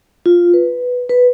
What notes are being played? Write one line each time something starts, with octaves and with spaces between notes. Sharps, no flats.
F4
B4
B4